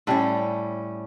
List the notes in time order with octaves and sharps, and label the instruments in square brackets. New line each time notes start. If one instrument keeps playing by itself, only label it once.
[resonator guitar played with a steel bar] A2 G3 C#4